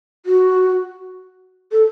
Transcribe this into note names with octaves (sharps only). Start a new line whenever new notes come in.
F#4
A4